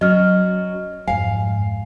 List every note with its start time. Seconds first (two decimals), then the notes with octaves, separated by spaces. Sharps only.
0.01 F#3 C#4 D#5 F6
1.07 F2 G#2 F5 G#5